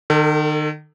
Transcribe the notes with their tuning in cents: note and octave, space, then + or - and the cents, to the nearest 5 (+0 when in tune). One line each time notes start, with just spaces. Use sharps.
D#3 -35 A4 +25